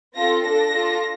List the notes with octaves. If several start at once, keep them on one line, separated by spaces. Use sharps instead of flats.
C4 F4 A4 A#6
D4 A4 A#6
D4 F4 A4